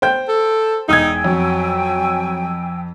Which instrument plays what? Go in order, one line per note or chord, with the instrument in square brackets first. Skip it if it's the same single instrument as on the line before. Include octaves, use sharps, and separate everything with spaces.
[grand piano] C5 G5 G6
[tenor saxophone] A4
[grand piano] E1 D#6 G#6 [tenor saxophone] D#4 [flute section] G5 G#5 E6
[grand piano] F2 [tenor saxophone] F#3